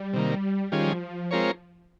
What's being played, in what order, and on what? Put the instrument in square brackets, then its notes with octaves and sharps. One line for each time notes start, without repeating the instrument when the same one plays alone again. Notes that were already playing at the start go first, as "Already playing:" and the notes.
Already playing: [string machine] G3
[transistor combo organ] C3 D#3 A#3
[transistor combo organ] D#3 G3 C#4 F4 G#4 [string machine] F3
[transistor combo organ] G#3 C4 F4 A#4 C#5